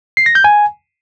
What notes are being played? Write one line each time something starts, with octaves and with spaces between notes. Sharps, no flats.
C7
A#6
G6
G#5